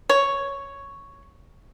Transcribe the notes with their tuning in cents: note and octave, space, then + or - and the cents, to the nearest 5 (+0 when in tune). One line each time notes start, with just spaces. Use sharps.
C#5 +0